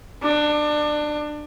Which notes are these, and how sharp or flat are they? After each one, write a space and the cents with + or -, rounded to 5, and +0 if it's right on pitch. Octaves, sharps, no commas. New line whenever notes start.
D4 +25